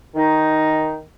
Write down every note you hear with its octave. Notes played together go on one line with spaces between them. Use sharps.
D#3 D#4